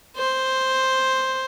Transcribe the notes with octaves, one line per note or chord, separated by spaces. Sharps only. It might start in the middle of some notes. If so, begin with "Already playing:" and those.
C5